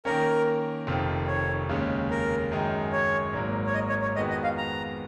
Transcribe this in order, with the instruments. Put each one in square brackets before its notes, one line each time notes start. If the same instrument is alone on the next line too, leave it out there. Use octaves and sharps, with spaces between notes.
[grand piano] D#3 A#3 C#4 [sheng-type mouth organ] A#4
[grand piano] F1 F2 D#3
[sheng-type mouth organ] C#5
[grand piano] D#2 C#3 G#3 C#4
[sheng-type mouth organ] A#4
[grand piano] F#2 D#3 G#3 D#4
[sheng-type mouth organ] C#5
[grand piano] G#1 G#2 F#3 A#3
[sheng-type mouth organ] C#5
D#5
C#5
C#5
[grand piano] F2 D#3 G#3 B3 F#4 [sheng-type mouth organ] D#5
[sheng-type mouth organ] D#5
F5
A#5